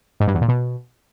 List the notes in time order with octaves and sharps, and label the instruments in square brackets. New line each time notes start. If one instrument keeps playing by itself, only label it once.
[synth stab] G#2
G2
E2
A#2
B2